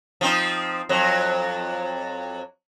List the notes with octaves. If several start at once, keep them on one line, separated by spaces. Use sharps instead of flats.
F3 C4 D#4
F2 F#3